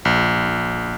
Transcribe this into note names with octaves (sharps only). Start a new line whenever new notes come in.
A#1